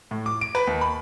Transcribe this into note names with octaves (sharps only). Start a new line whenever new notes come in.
A2
D6
D7
B4
D#2
B5